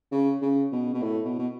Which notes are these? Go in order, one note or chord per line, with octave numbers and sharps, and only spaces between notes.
C#3
C#3
B2
B2
A2
B2
B2